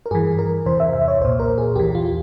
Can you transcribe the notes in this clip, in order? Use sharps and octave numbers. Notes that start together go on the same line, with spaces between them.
A#4
G2 E3 G#4
A#4
E2 C3 E3 C5
E5
E5
C#5
C2 A#2 C5
A#4
G#4
E2 E3 G4
F4